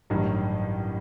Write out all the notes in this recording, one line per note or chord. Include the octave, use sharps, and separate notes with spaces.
A1 G2 D#3 F#3